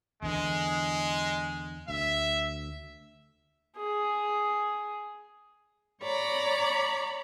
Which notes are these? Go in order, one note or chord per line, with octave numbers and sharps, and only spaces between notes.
E2 D3 E3 G#3
D2 E5
G#4
C#5 D5 A#5 B5